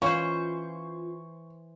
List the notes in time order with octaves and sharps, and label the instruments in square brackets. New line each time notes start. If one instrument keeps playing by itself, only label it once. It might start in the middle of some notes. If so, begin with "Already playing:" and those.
[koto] E3 C5 [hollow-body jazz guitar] C#4 C#5 D#5 [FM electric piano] F4 [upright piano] C#6